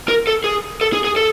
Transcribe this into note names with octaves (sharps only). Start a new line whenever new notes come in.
A#4
A4
G#4
A4
G#4
G#4
A4